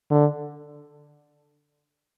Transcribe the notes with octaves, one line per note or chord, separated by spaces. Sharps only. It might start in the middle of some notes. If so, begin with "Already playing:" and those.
D3